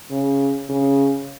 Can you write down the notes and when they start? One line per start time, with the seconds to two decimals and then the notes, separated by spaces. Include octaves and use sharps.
0.11 C#3
0.69 C#3